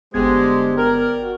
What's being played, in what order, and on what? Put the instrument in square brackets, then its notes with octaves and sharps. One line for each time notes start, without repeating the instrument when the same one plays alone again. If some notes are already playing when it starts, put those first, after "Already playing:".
[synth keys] G1 B3 G#6 [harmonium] D3 G4 C5 [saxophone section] G#3
[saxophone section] A#4 [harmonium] D5 G5
[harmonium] F#4